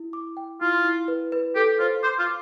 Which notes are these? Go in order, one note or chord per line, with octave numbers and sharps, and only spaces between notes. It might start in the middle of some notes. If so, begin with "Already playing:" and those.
Already playing: E4
D6
G5
E4 F4
E4
B4
B4
G4 A4
F4 C5
C5 D6
F4
D6